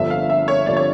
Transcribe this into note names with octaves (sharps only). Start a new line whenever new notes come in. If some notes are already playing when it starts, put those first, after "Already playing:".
Already playing: G1 G2 D3 F3 E5
F5
E5
C#5
G2 D3 F3 D5
C#5